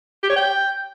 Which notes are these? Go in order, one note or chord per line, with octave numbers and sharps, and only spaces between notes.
G4
C#5
G5